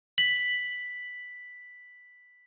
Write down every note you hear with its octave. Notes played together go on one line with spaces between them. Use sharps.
B6 F#7